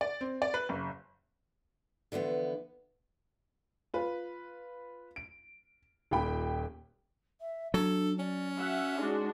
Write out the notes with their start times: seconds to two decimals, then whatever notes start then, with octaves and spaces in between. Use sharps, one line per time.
0.01 D5
0.21 C4
0.42 D5
0.54 B4
0.69 F#1
2.12 D3 E3 F3 B3
3.94 F4 B4
5.16 D7
6.11 D#1 A#2 G5 B5
7.40 E5
7.74 F#3 D4 A4
8.19 C#4 D5
8.57 F#4 E5 F#5
8.97 G#3 D4 D#4 F#4